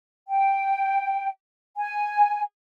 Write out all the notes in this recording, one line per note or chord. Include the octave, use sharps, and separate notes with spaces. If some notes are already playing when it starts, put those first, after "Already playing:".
G5
G#5